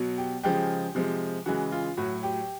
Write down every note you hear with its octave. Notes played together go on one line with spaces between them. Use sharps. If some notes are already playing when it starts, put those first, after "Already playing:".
Already playing: B2 F#3
G4
C#3 F3 G#3 G4
C3 F3 G#3
C#3 E3 G#3 F#4
F4
A2 F#3 F#4
G4